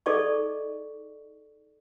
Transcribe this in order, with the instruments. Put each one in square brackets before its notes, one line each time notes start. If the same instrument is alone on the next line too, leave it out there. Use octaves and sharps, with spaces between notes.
[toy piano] D#4 G#4 A4 D5 D#5 C#6